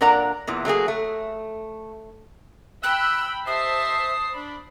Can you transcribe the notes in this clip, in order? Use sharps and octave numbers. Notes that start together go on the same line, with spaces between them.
A#2 D4 A#4 D5 F#5 A#5
E2 A#2 E3
F#3 A3 A#3 G#4
A3
G5 B5 E6 F#6
G4 C5 D#5 E5 A5 D#6 C7
D4 D5 B5